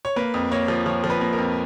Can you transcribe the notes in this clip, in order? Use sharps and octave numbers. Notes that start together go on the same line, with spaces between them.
C#5
A#3 B4
F2
A#3 C#5
F3
F3 C#5
F3
B4
A#3
A#4
F2